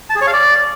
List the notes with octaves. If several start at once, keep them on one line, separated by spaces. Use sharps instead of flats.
A5
G#4
C#5
F5
D5